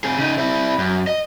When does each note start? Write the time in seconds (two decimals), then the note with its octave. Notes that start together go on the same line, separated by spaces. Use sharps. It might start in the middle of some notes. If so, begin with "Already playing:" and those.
0.04 C4 G#4
0.17 C#3 D#4
0.38 C4 E4
0.78 F#2
1.07 D#5